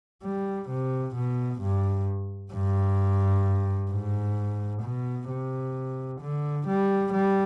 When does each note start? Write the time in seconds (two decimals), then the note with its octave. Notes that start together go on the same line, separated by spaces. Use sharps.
0.23 G3
0.69 C3
1.15 B2
1.61 G2
2.53 G2
3.91 G#2
4.82 B2
5.29 C3
6.21 D3
6.67 G3
7.13 G3